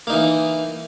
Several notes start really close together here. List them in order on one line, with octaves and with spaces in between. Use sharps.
A#3 D#4 E3